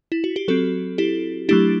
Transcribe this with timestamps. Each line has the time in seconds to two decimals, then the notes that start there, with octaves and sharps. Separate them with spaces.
0.12 E4
0.24 F#4
0.36 G4
0.48 F#3 C4 F#4 A4
0.98 E4 G4
1.49 F#3 A3 D4 E4 G4